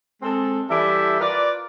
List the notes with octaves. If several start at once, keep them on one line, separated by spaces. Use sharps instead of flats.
G#3 C4 A4
E3 G3 E4 G4 A4 E5
F4 A#4 B4 D5